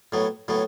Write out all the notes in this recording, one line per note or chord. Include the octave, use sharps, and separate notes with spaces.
A2 F#3 B3
A2 F#3 B3